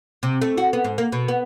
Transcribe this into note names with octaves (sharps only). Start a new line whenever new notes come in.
C3
A3
F#4
B3
G#2
A#3
B2
B3